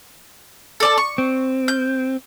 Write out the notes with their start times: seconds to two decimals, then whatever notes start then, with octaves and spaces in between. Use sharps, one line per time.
0.80 A4 D5 A5
0.98 C#6
1.18 C4
1.68 G6